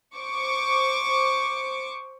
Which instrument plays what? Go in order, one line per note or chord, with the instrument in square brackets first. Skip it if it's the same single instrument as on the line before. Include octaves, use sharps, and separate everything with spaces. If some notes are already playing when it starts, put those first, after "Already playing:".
[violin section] C5 C#6 D6